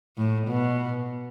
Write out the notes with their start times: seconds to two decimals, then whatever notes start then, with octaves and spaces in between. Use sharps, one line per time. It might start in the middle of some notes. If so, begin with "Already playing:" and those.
0.17 A2
0.47 B2